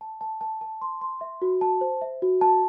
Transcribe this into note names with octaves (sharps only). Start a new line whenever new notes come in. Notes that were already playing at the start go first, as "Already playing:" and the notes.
A5
A5
A5
A5
C6
C6
E5
F#4
A5
C5
E5
F#4
A5